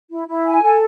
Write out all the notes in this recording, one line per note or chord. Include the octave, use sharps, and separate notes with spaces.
E4
E4
G#5
A4